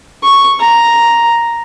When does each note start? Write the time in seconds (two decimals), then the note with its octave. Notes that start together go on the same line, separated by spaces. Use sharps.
0.24 C#6
0.60 A#5